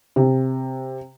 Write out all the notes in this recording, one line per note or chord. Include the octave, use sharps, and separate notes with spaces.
C3